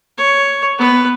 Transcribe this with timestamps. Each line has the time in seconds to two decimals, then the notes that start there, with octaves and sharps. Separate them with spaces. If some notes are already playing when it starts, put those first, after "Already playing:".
0.18 C#5
0.78 B3 B4